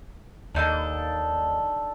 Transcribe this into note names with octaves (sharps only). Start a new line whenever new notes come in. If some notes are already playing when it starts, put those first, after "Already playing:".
D#2 D4 D#4 A4